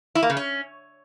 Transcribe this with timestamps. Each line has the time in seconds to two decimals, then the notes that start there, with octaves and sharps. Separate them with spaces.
0.15 E4
0.23 A#3
0.30 C#3
0.37 C#4